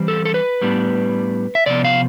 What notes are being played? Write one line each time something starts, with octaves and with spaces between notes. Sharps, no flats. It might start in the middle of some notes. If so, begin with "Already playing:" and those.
Already playing: E3 G3 C4
A4
A4
B4
A2 G3 B3 D4
E5
C3 F3 B3 D5
F5